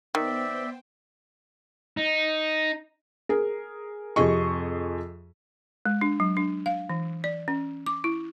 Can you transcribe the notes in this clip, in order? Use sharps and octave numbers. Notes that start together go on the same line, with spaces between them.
D#3 B3 C5 D5 E5 G5
D#4
G#4 A#4
F2 C3 G#4 D#5 C#6
G#3
D4
F#3
D4
F5
E3
D5
C#4
D6
E4